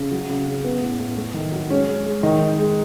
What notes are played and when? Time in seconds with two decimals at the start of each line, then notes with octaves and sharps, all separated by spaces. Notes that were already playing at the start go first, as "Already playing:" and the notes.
Already playing: C#3
0.11 F#3
0.29 C#3
0.47 C#3
0.64 B3 B4
0.81 A2
0.99 A2
1.17 A3
1.34 D#3
1.52 F#3
1.69 G#3 C#4 C#5
1.87 G#3
2.06 G#3
2.23 D#3 D#4 D#5
2.40 D#3
2.58 G#3